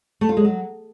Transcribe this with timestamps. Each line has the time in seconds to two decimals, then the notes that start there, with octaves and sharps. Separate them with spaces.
0.21 A3
0.29 F4
0.37 G#3
0.45 F#3